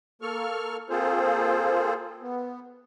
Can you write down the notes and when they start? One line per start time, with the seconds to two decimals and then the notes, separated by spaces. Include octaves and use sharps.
0.22 A#3 A4 C#6 F6
0.89 A#3 C4 F4 G#4 A4 C5
2.22 B3